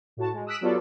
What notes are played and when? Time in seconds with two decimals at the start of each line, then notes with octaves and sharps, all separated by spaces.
0.17 A2 F#4 A5
0.33 G#3
0.46 D#6 E6 F#6 B6 D7 E7
0.61 F#3 G3 B3 F4 A4 D5